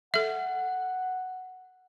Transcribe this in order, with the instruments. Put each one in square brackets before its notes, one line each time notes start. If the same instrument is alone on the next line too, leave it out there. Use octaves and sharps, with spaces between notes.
[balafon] A4 E5 [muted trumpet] F#5